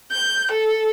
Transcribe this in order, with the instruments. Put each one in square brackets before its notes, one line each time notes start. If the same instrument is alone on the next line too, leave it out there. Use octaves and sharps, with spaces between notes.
[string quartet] G6
A4